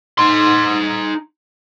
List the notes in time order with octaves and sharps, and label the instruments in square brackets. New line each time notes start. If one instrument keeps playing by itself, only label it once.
[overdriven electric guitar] D#4 C6